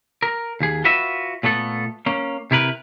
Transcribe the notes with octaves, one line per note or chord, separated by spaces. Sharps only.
A#4
D#2 G#4
F4 F#4 B4 E5
A#2 A3 B3 A4
A#3 C#4
C3 E4 A#4 B4